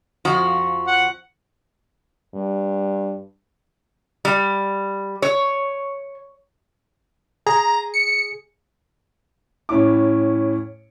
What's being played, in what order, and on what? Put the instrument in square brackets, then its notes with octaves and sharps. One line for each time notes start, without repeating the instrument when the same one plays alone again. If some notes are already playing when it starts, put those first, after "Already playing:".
[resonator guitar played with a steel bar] F2 F3 F#4
[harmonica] F#5
[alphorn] G2
[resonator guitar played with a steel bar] G3
C#5
[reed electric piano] G#4 [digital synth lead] A#5
[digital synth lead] C#7
[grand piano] A2 C#4 E4 D6